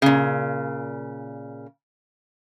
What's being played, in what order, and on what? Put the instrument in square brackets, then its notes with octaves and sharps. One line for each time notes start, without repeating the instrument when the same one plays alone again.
[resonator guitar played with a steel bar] A#2 C#3